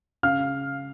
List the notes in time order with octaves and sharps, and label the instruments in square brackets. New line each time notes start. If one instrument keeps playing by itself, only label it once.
[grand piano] C#3 F5 F6